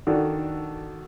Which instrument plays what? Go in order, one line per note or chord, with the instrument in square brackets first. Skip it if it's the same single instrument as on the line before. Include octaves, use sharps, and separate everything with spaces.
[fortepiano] D#3 D4 F#4 A4